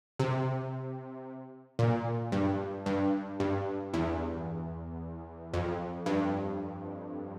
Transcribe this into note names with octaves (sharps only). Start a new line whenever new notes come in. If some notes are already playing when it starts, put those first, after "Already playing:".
C3
A#2
G2
G2
G2
E2
F2
G2